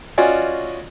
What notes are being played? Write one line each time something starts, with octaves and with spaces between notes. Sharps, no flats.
C#4 F4 F#4 D5 D#5 G#5